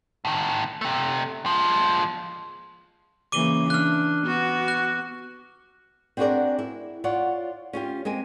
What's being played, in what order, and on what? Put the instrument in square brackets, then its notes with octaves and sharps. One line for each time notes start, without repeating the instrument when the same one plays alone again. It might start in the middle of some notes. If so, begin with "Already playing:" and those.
[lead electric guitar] A2 D#3
C3 A3
F3 G#3
[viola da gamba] C#3 E3 A#3 [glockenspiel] D6 D#7 G7
[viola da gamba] D4 [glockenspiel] F6 F#6
[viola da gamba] B3 F#4
[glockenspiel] F#6
[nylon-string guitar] C4 D4 F#4 G#4 A#4 D5
E4
F4 C#5 D5 F#5
C#4 F4 G4
G#3 A#3 C4 G#5